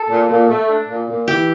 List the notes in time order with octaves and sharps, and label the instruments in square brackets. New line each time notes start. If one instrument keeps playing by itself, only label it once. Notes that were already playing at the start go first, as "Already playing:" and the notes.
Already playing: [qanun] A4
[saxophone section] A#2
A#2
A3
D4
A#2
A#2
[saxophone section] E3 [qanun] G4